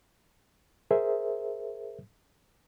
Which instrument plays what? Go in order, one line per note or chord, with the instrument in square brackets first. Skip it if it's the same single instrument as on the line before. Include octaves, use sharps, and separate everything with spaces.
[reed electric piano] G#4 A#4 C5 E5